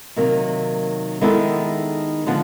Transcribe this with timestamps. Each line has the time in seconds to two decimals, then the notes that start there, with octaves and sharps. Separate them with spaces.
0.16 C3 D#3 F#3 A#3
1.21 D#3 G#3 B3 E4 A4
2.27 D3 F3 G#3 B3 D4